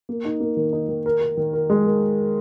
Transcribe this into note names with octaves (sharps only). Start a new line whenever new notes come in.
A#3
D#4
A#3
D#3
D#4
D#3
A#4
A#4
D#3
A#4
G#3
D#3